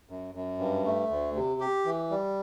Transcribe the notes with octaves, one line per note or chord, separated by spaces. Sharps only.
F#2
F#2
G2
A3
D2
C3
G4
E3
G3